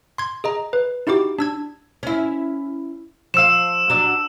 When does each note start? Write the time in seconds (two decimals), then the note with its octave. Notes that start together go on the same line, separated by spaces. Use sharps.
0.18 C6 G#6
0.44 G#4 D#5 A#5
0.73 B4
1.07 D#4 E4 F#4 G4 D6
1.39 D4 E6 G#6
2.03 C#4 E4
3.34 F3 F5 E6 E7
3.90 F#3 D4